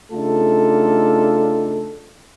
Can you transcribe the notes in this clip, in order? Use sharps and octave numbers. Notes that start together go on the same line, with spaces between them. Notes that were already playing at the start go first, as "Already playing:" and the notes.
C#3 A3 D4 D#4 F4 A4